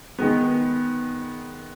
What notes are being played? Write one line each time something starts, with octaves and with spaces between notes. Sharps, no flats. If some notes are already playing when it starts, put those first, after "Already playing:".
D#3 G#3 B3